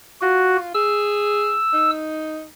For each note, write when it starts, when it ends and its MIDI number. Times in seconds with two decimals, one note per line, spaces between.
0.21 0.70 65
0.21 0.57 66
0.74 1.59 68
0.74 1.91 88
1.73 2.44 63